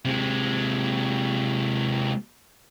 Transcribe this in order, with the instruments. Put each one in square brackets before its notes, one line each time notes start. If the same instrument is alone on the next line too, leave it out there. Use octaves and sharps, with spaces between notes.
[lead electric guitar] C3 G#3